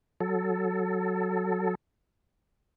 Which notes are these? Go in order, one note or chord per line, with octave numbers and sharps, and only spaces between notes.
F#3 A4